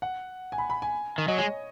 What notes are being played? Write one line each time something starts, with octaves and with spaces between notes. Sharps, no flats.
F#5
G#5
B5
B5
G#5
D#3
F#3 D#5
G#3 C#5